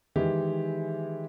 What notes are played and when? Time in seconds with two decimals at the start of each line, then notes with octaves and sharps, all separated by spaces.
0.16 D#3 E3 G#3 E4 G4